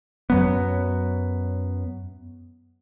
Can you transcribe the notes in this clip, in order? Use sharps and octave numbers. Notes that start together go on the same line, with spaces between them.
F#2 F#3 B3